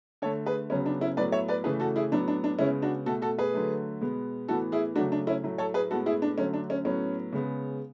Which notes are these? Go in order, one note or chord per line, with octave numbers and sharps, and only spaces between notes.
D3 A3 A4 C#5
G#4 B4
C#3 F#3 B3 C#4
D4
C#4 E4
A2 F#3 B3 B4 D5
C#5 E5
B4 D5
C#3 E3 A3 G#4 B4
F#4 A4
E4 G#4
A2 F#3 B3 D4
D4
D4
C#3 G#3 B3 C#4 E4
D4 F#4
B2 A3 F#4 A4
F#4 A4
G#4 B4
D3 F#3 A3
B2 G#3 B3
A2 E3 B3 F#4 A4
E4 G#4
C#3 F#3 A3 D4 F#4
D4
C#4 E4
A2 F#3 A3
A4 C#5
G#4 B4
A2 G#3 B3 F#4 A4
E4 G#4
D4
D3 F#3 A3 C#4
D4
C#4
A2 F#3 B3 C#4
C#3 G#3 B3